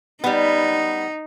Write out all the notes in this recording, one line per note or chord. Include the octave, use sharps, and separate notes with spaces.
G3 B3 D#4